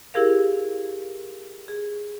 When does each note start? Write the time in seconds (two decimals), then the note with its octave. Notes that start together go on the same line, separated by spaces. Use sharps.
0.14 E4 G4 G#4 A#4 F5
1.68 G#4